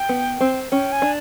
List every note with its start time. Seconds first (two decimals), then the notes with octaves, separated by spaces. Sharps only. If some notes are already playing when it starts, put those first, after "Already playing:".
Already playing: G5
0.09 B3
0.41 C4
0.72 C#4 G5
0.92 G#5
1.02 D4